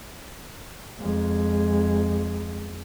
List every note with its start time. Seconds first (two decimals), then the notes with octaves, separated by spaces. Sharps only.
0.98 F2 G#3